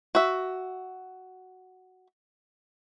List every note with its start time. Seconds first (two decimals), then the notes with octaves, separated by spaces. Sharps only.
0.15 F#4 E5